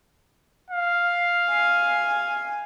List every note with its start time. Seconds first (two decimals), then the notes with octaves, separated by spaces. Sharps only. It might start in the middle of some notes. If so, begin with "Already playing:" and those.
0.71 F5
1.50 G#5